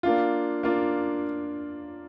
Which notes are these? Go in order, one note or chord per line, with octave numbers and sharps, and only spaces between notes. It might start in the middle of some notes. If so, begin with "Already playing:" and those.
A#3 D4 F4
A#3 D4 F4